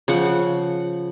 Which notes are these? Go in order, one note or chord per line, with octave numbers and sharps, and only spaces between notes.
C#3 F3 F#5